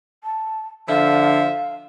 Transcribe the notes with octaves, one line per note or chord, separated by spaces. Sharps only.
A5
D3 F3 E5 F5